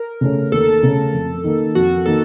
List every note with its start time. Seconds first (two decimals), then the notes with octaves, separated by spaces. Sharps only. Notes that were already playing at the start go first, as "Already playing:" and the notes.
Already playing: A#4
0.21 C#3 A3 C#4
0.52 D#2 A4
0.83 C#3 A3 C#4
1.13 F2
1.44 D#3 A#3
1.75 F2 F#4
2.06 D#3 A#3 A4